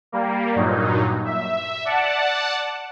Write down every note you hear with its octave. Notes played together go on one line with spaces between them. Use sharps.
G3 A#3
G2 A#2 F#3 D#4
E5
D5 F#5 A5